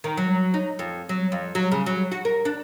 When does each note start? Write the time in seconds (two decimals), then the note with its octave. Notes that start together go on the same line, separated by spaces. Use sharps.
0.04 D#3
0.17 F#3
0.54 D#4
0.79 F2
1.09 F#3
1.32 F2
1.55 F#3
1.72 C#3
1.86 F#3
2.12 F#4
2.25 A#4
2.45 D4